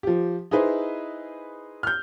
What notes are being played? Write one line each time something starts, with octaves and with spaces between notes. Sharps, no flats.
F3 G4
D#4 E4 G#4 B4 C5
F6 G6